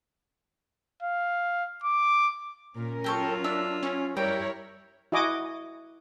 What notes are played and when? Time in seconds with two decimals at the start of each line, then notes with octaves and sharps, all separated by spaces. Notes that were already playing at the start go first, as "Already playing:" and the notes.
1.03 F5
1.84 D6
2.76 A#2 C#4 A#4
3.04 F#3 F4 G4 A4 C#6
3.44 D4 E5
3.83 C#4
4.17 G3 E4 A#4 C#5 G5
5.12 E4 F#4 D#5 G#5 D6 D#6